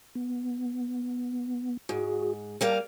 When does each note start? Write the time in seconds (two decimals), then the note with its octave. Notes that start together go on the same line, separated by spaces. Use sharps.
0.15 B3
1.89 G#2 F#4 G#4
2.61 G3 A#3 F5 A5